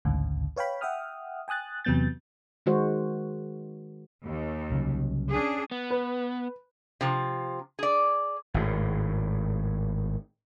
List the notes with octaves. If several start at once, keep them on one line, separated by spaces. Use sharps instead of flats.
A1 D2 G#2 C#3
B4 C#5 F5 G5 B5
E5 F#5 G5 D#6 F6
G5 G#5 D#6 F#6 A6
E2 C3 F#3 B3 G6 A6
D#3 G#3 F#4 C5
D#2
C2 C#3 F#3
C#4 D4 G#4
B3
B4
C3 F3
G#4 D5
G#1 A2